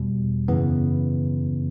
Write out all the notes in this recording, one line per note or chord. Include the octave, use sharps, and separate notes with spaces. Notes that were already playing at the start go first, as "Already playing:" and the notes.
Already playing: E2 B2 G3
F#2 C#3 E3 B3